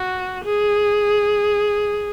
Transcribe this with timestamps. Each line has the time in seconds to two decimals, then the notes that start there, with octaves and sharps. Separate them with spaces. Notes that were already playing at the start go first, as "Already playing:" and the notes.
Already playing: F#4
0.45 G#4